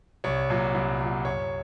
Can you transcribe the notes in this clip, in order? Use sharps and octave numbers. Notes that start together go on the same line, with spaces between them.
C2 C#5
A#2 F#3
C2
A#2 F#3
F#2 C#5